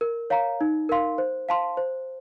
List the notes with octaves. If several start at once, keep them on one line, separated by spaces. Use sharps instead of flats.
A#4
C#5 F5 A#5
D#4
A#4 F5 C6
C5
F5 A5 C6
C5